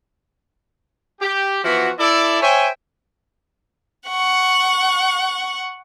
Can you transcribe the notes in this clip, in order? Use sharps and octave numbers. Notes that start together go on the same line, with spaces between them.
G4
E3 F3 B3 F#4
E4 A4 D5
C5 C#5 E5 G5 G#5
F#5 C#6